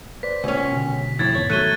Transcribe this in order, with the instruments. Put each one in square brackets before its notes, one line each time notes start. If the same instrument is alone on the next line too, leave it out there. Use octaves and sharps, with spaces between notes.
[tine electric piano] B4 C5 D5 [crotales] B6
[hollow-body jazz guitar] C#2 A#2 C#4
[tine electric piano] B2 D3
[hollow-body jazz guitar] F2 A2 E3 [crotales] G#6 A6
[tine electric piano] E2 G#2 B3 [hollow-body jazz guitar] C#5
[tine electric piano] D#3 [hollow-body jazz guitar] F#3 A3 [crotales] F#6 D#7 G7